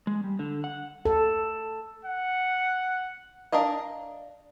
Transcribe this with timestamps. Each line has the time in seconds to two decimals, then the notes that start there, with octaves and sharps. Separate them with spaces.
0.07 G#3
0.24 G3
0.39 D3
0.64 F#5
1.05 A4
2.05 F#5
3.52 D4 A#4 D#5 F5